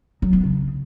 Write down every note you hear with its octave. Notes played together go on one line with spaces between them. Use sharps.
F#3
B3
C#3